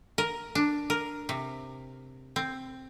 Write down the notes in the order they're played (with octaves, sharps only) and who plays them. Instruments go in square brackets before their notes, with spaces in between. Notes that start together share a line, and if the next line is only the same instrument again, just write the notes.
[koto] A#4
D4
A#4
C3
C4